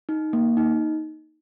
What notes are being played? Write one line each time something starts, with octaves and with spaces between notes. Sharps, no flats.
D#4
A#3
D#4